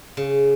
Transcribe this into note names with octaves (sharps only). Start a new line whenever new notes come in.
C#3